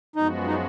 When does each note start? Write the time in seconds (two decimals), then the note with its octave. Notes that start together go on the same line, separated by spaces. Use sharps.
0.16 F#2 F3 G#3 B3 D#4 F#4
0.47 D#4